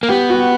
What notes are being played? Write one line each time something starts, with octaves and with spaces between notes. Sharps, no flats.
A#3
B3 G4
F#4